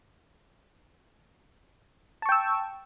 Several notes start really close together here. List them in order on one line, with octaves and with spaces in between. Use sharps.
A5 C#6 G5 E6